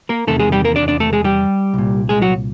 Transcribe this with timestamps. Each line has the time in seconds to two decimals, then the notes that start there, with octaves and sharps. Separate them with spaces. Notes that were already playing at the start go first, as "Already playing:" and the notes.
0.09 A#3 A#4
0.27 E2 C3 D#3 A3 A4
0.40 G#3 G#4
0.52 G3 G4
0.65 A#3 A#4
0.76 D4 D5
0.88 D4 D5
1.00 A3 A4
1.13 G#3 G#4
1.24 G3 G4
1.74 C2 A#2
2.09 G#3 G#4
2.22 F#3 F#4